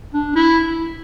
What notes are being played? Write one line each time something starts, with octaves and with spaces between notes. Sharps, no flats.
D4
E4